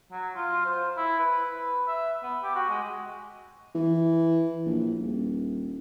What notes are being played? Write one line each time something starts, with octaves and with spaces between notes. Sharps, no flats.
F#3
F4
C5
E4
B4
E5
B3
G4
F#4
G#3
E3
A#1
D#1